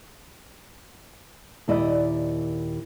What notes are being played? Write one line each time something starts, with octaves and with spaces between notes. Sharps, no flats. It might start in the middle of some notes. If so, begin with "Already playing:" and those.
D#2 A#2 E4 D5 D#5